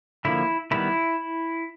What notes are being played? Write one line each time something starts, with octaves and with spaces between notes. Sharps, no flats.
D3 F3 A#3 E4
D#3 G3 B3 E4